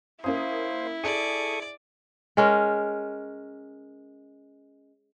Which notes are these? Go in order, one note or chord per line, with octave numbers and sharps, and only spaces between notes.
A#3 C#4 E4 C5 F5 D#6
G#4 A4 D5 C#6 D#6
G#3 C#4 A#4